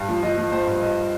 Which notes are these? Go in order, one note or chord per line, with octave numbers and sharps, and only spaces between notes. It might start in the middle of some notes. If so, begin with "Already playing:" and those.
Already playing: G2
F3
F3 D#5
F3
F3 C5
G2
G2 D#5